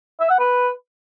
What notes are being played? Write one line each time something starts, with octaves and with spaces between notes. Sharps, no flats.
E5
F#5
B4